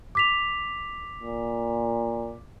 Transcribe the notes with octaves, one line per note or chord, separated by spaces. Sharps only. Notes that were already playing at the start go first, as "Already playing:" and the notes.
D6 B6 F7
A#2